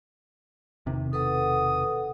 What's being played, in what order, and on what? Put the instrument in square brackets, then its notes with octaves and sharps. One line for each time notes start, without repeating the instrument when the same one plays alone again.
[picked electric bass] E1 C3 D#3
[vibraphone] A4 B4 F#5 [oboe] D#6